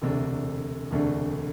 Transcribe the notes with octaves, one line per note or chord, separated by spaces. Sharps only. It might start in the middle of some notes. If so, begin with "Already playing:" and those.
E1 D2 C3 A3 D4
E1 D2 C3 A3 D4